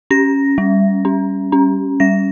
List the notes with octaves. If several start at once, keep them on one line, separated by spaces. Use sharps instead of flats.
C#4 A#6
G3
C#4
C#4
G3 A#6